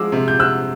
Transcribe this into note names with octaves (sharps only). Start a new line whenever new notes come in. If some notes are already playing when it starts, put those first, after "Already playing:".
Already playing: F3 G#3 D6 E6
C3
G6
C3 E6 F#6